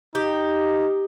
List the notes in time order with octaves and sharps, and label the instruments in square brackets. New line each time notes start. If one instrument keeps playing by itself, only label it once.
[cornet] D#4 [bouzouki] G4